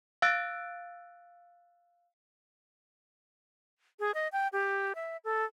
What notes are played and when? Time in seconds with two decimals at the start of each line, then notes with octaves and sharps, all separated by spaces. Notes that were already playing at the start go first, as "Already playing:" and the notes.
0.22 F5 E6 F#6 A6 D7
4.00 G#4
4.14 D#5
4.32 G5
4.53 G4
4.95 E5
5.24 A4